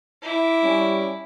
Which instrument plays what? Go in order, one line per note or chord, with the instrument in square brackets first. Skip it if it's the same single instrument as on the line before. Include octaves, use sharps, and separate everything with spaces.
[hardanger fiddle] E4 D6
[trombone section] G3 C#4